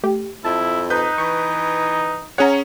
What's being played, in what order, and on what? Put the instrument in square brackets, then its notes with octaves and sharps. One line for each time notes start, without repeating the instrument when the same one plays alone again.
[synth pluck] A3 G4
[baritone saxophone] F2 [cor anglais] E4 [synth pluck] A5
[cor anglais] D#4 [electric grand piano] B4 G6
[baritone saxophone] E3 [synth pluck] C#6
[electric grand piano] C#4 G#4 C#5 [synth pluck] F#5 A#5